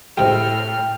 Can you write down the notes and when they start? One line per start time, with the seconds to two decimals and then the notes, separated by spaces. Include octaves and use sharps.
0.17 A2 C3 G#3 G5 F6